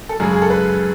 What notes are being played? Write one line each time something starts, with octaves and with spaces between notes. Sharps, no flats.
A4
F#2 C#3 G#3 G#4
G#4
A4
B4